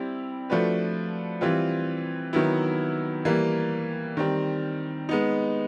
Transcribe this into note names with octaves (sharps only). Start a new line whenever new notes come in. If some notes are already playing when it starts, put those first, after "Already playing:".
Already playing: G3 C4 E4 G4
F3 A3 D4 F#4 B4
E3 G3 C4 F4
D#3 F#3 B3 E4
E3 G3 A#3
D#3 G3 C4
G#3 B3 D#4